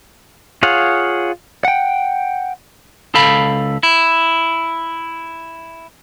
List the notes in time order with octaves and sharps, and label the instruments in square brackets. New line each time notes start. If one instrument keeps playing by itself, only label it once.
[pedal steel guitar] F4 G#4 C#5 F5 F#5
[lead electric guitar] F#5 G5
[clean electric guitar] C#2 A4 F5 B5
E4